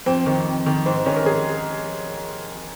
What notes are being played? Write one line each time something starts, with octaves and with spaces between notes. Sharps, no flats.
F2 C4
D#3
F2
D#3
G#2 C4
C4
D#3 C#4
A#4
G#4